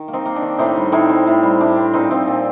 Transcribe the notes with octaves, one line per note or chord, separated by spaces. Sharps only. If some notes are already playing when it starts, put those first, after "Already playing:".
Already playing: D#3
A#3
C4 D#4
A#3
D4
D#3
A2 C4 D#4
G3
A2 C4 D#4
C4
A2
G3
A2 D4
C4
A#2 C4 D#4
F3 C4 D#4
A#2 D4